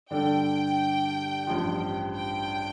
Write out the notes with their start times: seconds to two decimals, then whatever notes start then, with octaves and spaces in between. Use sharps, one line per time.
0.10 G2 D3 G3 D4 A4 G5
1.47 A1 G2 F3
2.16 G5